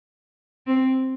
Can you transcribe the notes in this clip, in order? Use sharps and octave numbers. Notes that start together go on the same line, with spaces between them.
C4